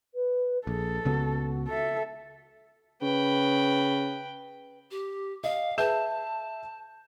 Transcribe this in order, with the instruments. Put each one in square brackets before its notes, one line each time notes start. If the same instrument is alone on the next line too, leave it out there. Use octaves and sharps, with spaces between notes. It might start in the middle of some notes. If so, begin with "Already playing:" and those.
[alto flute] B4
[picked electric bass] A#1 [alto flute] G#4 [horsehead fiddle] A4
[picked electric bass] C#2 C#3 B3 [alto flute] F#4
[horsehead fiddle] A4 E5
[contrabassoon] C#3 [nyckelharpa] B4 G5
[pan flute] G4
[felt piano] D#5 [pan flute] F5
[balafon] G#4 B4 G5 [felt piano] E5 G6 E7 [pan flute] A5